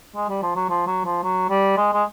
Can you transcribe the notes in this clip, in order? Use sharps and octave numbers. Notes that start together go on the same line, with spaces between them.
G#3
G3
F3
F#3
F3
F#3
F3
F#3
G3
G#3
G#3